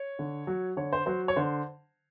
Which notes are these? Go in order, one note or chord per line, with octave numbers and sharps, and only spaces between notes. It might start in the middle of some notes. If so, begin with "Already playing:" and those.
Already playing: C#5
D3
F#3
D3 C#5
C5
F#3 C5
C#5
D3 C5